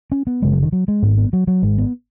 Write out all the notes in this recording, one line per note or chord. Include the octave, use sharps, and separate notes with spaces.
C#4
B3
F#1 F#2 C#3 G#3
F#3
D#3
F#3
G#3
G#1 G#2 B3
B3
F#3
F#3
G#1 G#2 G#3
B3